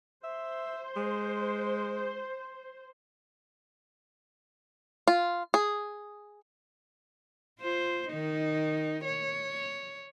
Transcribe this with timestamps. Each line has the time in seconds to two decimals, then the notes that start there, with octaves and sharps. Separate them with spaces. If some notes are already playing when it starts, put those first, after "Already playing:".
0.24 C5 E5
0.96 G#3
5.08 F4
5.54 G#4
7.60 F4 C5
8.09 D#3 D#4
9.04 C#5